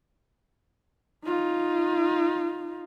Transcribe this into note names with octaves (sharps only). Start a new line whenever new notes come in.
D#4 F4